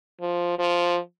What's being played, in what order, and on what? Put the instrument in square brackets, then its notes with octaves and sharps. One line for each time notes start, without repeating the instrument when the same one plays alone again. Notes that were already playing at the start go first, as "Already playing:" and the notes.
[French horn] F3
F3